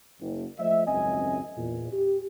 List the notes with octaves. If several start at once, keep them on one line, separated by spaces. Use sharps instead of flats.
F#1
F3 A3 C5 D#5 E5
G#1 C#2 F#2 C4 D#5 G#5
E2 A#2
G4